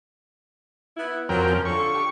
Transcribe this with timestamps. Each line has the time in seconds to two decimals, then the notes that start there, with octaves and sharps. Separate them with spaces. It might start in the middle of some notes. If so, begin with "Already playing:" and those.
0.97 B3 E4
1.29 F2 F#3 A#4 G5
1.47 C#4
1.65 D3 F4 A4 C#6
1.93 D3 G4